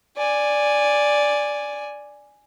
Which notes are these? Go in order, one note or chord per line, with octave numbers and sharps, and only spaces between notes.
D5 G#5